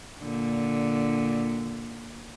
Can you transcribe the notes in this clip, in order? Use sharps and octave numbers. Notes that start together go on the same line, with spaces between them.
A#2 D3